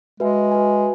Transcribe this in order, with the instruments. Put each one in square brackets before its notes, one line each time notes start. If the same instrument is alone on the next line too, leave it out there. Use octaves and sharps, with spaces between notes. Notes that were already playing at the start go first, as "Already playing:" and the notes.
[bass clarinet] G#3 [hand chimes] F#4 B4 E5 G#5
[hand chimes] F#4 B4 E5 G#5